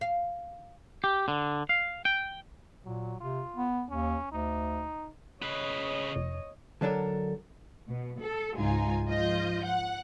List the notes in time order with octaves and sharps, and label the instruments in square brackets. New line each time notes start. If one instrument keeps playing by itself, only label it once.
[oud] F5
[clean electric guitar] G4
D3
F5
G5
[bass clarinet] A#2 [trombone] F#3
[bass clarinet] C3 [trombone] F4
[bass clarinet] B3
[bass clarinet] D#2 [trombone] C#4
[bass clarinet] D2 [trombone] D#4
[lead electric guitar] C#3 B4 [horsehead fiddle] C#5 D#5
[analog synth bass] F1
[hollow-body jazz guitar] D3 F#3 D4 A4 A#4
[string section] B2
A4
C#2 G#2 D#4 F4 G#5
G#2 F3 F4 D#5 G6
F#5